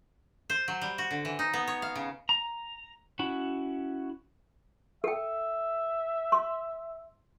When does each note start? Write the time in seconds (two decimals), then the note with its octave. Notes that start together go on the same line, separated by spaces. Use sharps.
0.50 C5
0.68 F#3
0.82 G3
0.98 F#4
1.11 D3
1.25 E3
1.39 D#4
1.53 B3
1.68 C#5
1.82 F5
1.95 C#3
2.29 A#5
3.19 C#4 E4 F#4
5.04 A4 E5 G5
6.32 C6